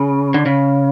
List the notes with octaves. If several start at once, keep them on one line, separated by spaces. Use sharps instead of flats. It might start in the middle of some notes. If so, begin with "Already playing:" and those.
Already playing: C#3
D3
C#3